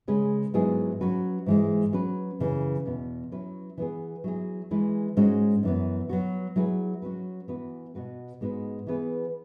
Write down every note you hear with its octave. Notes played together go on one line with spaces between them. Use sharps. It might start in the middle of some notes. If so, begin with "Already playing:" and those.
C#3 G#3 C#4 G#4 B4
G#2 F#3 B3 E4 G#4
F#3 C#4 F#4 B4
G#2 E3 G#3
F#3 C#4 F#4 B4
F#2 C#3 E3 C#4
E2 B2 B3
F#3 C#4 E4 B4
E3 B3 E4 G#4
F#3 E4 G#4
E3 G#3 E4 B4
G#2 G#3 C#4 F#4
F#2 E3 B3
F#3 B3 F#4
F#3 E4 G#4 B4
F#3 C#4 F#4 B4
E3 B3 F#4 B4
B2 B3 F#4 B4
G#2 G#3 B3 F#4 B4
E3 B3 G#4 B4